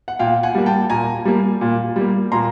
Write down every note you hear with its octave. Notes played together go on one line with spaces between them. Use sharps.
F#5
A#2 F5 G5
F#5 G#5
G3 A#3
G5 A5
A#2 G#5 A#5
G3 A#3
A#2
G3 A#3
A#2 A#5 C6